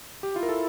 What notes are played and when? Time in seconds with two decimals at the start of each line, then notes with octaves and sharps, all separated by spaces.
0.23 G4
0.35 E4 F4
0.43 A#4
0.49 A4